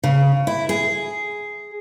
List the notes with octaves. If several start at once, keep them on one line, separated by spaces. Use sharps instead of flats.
C#3
E4
G#4